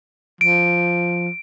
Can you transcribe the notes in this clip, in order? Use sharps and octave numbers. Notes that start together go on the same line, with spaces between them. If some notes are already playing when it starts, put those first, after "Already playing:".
F3 D7